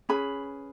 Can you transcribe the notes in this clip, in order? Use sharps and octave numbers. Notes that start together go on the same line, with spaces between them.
C#4 G#4 B4 B5